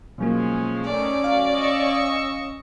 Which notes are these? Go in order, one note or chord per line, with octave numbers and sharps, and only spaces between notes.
B2 F3 F#3 G#3 A#3 C#4
D#3 A3 C#4 D5
F#3 F5
D#5 C#6 E6